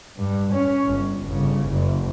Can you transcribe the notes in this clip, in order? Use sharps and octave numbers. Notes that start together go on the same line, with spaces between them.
G2
C#4
G1
G1 C#3
F#1